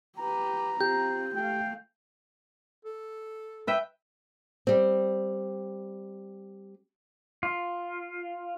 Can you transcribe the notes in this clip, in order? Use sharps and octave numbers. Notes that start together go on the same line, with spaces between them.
G4 B4 A#5
C4 F4 G4 G6
A3 F5 G5
A4
B4 E5 G5
G3 C4
F4